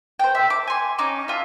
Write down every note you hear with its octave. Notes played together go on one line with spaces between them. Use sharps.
C5 G5
E5
D6
G#5 C6
C#4 D#4 D6
F4 E5